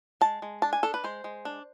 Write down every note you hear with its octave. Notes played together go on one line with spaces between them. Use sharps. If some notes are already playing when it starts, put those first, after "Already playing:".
G#3 A5
G#3
D4 A5
G#5
D4 A4
B4
G#3 C5
G#3
D4